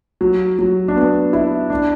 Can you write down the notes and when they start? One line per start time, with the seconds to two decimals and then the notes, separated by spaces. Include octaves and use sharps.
0.21 F#3
0.59 F#3
0.88 D4
0.96 B3
1.33 E4
1.70 D4